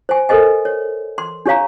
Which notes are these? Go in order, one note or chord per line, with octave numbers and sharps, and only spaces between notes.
C5 G#5
A4 A#4 C5 D#5 G#5
C#5
C6
D4 G4 C#5 F5 A#5